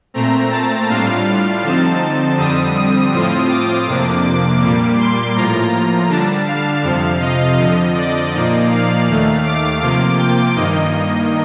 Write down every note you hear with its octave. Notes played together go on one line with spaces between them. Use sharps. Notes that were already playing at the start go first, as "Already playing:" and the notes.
A#2 A3 C4 A#5
A5
A2 G3 D4 F4 F5
D3 F3 C4 D#4 A5
F2 D3 G3 C4 D#6
D#6
A2 F3 C4 F4
D6
F2 C3 F3 A#3 D4
D6
A#2 G3 A#3
C6
A2 F3 A#3 F4 A#5
D3 G3 D4 A5
F5
F2 C3 F3
D#5
F2 D3 F3
D5
A#2 F3 A#3 D#4
F5
D#2 D#3 A3
D6
C3 F3 A#3 F4
G5
G2 D#3 A#3 D#4 D#5